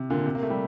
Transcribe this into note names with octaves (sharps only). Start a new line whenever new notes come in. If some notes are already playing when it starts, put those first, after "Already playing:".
Already playing: C3
A#2 D3
C3
A#3
A3
G3